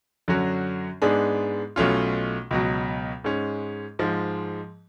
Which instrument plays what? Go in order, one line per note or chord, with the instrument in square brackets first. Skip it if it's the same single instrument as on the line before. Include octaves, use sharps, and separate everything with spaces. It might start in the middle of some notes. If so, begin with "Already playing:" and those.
[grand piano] F#2 D3 F#3 C#4 F#4
G#2 G#3 B3 D4 G#4
B1 B2 A3 C#4 F4
C#2 B2 F#3
G#2 G#3 C#4
G#2 F3 G#3